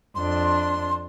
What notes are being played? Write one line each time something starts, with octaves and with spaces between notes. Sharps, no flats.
F2 D4 C6